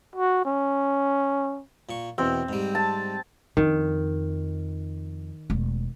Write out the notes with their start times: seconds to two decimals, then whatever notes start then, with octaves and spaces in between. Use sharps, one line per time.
0.16 F#4
0.46 C#4
1.89 A#2 C#6
2.18 E2 B2 C4
2.49 G#2 G3
2.75 A5
3.57 F2 D#3
5.50 E1 A3